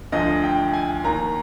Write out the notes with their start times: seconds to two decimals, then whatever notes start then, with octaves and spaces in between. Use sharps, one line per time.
0.12 D2 D3 F3 D#5
0.44 G5
0.73 G#5
1.04 D#2 D#3 A#5